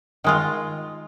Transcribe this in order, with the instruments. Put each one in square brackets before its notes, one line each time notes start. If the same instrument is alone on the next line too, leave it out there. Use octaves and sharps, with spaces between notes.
[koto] D#3 G#3 F4